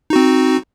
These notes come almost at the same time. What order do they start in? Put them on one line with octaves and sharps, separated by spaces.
D#4 F#4 C4